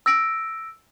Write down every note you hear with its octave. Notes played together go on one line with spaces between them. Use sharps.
E6 A#6 D7